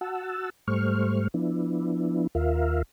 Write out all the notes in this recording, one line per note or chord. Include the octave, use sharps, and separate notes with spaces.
F#4 F#5 A5 E6
G#2 G3 A3 C5 C#6 F6
F3 B3 D4 E4
D#2 F4 A#4 E5 F5